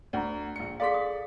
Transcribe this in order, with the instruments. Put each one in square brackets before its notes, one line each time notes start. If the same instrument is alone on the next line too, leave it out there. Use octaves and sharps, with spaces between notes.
[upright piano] D2 [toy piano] D5 A#5
[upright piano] A#1 C#7
[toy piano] G#4 A4 F5 [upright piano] D5 C6 B6
[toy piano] D#6